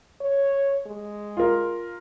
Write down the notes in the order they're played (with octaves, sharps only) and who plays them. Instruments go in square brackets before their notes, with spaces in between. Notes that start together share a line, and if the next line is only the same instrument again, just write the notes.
[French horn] C#5
G#3
[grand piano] F4 A#4